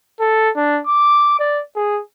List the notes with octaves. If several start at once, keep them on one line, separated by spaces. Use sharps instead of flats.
A4
D4
D6
D5
G#4